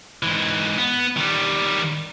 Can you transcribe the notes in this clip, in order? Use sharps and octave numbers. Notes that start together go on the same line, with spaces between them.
G#2 E3
B3
D#3 G3